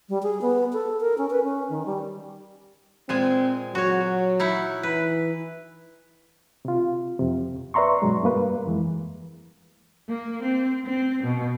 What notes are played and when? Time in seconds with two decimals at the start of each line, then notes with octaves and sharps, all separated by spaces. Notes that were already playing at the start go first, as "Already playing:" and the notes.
0.09 G3
0.23 G#4
0.42 B3
0.73 A4
1.01 A#4
1.18 C#4
1.31 B4
1.44 C#4
1.70 D#3
1.86 G3
3.09 A#2 G#3 C4 G#5
3.75 F#3 F#4 C#5
4.39 D#4 E4 F#5
4.83 E3 B4
6.65 C3 F4
7.19 F2 C3
7.74 B4 D5 E5 A#5 C6 C#6
8.02 G2 B2 F#3 G#3
8.23 G2 G3 A#3 B4
8.66 F2 E3 G#3
10.08 A#3
10.42 C4
10.85 C4
11.23 B2